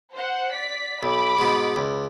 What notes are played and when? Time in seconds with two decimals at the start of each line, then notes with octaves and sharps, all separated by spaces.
0.13 C5 F#5
0.54 D5 B6
1.03 B1 B5 D6
1.39 G#2 B2
1.76 C#2